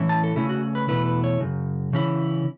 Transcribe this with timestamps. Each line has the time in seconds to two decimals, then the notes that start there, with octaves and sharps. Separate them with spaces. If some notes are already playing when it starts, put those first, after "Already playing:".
Already playing: A2 E3 C#4 E4
0.09 A5
0.24 A4
0.36 C#3 A3 C#4 E4
0.49 F#4
0.75 B4
0.88 E2 B2 A3 E4 B4
1.06 B4
1.24 C#5
1.40 F#2 C#3
1.93 C#3 E3 C#4 E4